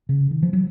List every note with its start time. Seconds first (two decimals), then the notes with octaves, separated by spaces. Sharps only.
0.09 C#3
0.31 D#3
0.43 F3
0.53 F#3